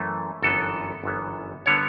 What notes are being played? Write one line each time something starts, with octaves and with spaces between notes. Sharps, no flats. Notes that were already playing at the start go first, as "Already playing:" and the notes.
Already playing: F#2 E3 A3
G1 F#2 E3 B3 A4
G1 F#2 E3 B3
D3 G3 B3 C#5